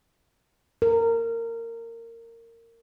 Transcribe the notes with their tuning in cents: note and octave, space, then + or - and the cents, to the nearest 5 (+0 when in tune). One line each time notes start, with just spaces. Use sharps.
A#4 -20